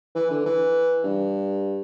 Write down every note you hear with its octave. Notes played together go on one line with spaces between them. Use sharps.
E3
D3
E3
G2